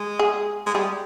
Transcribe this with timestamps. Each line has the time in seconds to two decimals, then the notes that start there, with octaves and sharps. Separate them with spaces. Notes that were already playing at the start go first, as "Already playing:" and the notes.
Already playing: G#3
0.19 G#4
0.66 G#3
0.74 G3 G#4